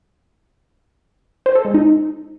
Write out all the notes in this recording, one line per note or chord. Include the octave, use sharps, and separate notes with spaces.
C5
A4
G#3
D#4